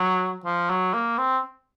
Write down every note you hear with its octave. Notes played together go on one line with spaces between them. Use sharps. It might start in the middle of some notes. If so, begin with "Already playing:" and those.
Already playing: F#3
F3
F#3
A#3
C4